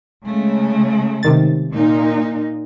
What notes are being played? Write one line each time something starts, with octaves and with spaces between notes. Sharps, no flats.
C#3 G#3 A3
C3 D#3 A6
A#2 D#4